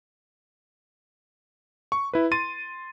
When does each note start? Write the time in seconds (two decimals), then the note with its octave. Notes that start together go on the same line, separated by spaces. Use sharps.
1.92 C#6
2.13 E4 B4
2.31 C6 A6 D#7